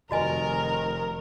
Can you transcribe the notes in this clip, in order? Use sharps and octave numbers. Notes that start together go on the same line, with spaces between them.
F1 D#3 F#4 A#4 D#5 G#5